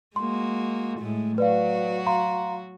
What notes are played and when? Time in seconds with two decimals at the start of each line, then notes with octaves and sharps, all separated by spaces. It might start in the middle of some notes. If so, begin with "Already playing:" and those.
0.16 G#3 A#3 F#4 C6
0.99 A2 G#3 A3
1.38 F#3 F#4 B4 D5 F5
2.06 F5 A#5 C6